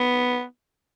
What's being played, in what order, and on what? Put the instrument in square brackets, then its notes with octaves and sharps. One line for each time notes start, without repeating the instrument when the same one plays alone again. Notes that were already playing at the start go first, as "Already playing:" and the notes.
Already playing: [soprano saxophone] B3